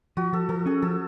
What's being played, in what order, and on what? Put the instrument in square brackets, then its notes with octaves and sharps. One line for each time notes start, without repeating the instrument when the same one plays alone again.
[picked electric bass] F3 [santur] F#4
[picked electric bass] F3 [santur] A4
[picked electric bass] F3 [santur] A4
[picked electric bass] C#4 [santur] G#4
[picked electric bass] F3 [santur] A4